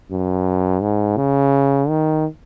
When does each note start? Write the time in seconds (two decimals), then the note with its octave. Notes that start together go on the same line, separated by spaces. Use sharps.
0.11 F#2
0.82 G#2
1.17 C#3
1.89 D#3